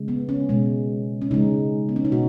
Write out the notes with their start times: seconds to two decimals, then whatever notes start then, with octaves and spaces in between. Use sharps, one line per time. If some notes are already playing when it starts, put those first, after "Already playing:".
Already playing: C#3 G#3
0.08 B3
0.29 C#4
0.49 B2 G#3
1.22 C#4
1.31 C#3 G#3 D#4
1.89 B3
1.96 C#4
2.05 D#4
2.12 B2 F#4